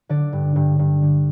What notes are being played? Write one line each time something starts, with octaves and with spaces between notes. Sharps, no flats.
D3 D5
G2
G2
G2
D3